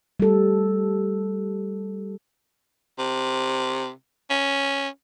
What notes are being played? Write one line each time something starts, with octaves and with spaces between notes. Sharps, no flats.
G3 A4
C3
C#4